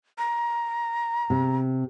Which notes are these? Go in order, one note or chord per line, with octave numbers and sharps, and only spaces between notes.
A#5
C3